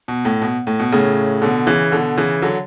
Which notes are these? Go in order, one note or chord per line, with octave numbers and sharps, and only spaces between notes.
B2
A2
B2
A2
B2
A2 C#3
B2 D3
C#3 E3
B2 D3
C#3 E3
D3 F#3